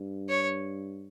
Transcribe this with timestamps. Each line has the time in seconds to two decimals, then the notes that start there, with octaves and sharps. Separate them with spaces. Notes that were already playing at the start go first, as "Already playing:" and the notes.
Already playing: G2
0.29 C#5